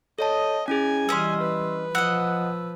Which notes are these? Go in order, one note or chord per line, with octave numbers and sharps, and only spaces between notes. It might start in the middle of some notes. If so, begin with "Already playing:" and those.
A4 C#5 D#5 A5
C#4 E4 G#4 G#5
E3 G3 C#4 D#5 C6 E6
B4
F3 D#5 F#5 E6